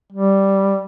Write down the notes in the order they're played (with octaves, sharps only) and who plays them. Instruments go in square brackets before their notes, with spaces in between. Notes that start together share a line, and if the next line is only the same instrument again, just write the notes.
[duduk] G3